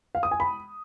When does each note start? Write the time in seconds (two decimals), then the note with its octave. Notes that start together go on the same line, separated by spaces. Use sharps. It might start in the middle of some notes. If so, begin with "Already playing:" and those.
0.15 F5
0.23 D#6
0.31 G#5
0.40 B5